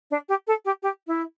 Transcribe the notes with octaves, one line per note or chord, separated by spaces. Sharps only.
D4
G4
A4
G4
G4
E4